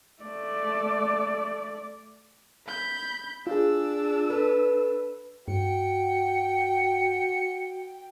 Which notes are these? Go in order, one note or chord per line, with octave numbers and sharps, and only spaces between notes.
A3 D5
B5 G6
D4 F4 G#4 E6
A4 B4
G2 F#4 G5 C#7